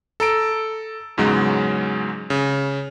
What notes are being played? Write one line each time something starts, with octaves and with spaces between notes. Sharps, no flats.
A4 A#5 D7
E2 G#2 C#3 F#3 G#3 D#4
C#3